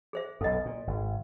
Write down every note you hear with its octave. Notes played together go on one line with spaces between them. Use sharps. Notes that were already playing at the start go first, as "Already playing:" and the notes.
G#4 C5 E5
B1 F#2 A4 D#5
A#2
G#1